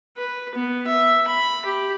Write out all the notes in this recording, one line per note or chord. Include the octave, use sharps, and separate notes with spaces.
B4
B3
E5
B5
G4